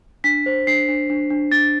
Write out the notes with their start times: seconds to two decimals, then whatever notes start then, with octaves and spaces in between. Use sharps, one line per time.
0.24 D4 B6
0.46 C5
0.67 D4 C7
0.88 D4
1.10 D4
1.30 D4
1.52 D4 A6